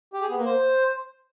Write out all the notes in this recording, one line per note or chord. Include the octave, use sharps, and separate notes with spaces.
G4
G#4
B3
A#3
C5